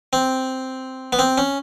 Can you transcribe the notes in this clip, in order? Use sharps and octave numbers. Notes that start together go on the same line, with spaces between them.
C4
B3
C4
C#4